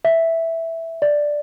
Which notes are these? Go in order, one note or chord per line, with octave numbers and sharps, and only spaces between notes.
E5
D5